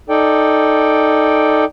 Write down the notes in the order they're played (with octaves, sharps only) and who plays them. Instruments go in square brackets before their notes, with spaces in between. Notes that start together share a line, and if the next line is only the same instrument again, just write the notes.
[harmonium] D#4 A4 D5 G5